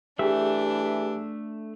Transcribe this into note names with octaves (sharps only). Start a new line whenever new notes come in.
E3 A3 D4 G4 G#4 E5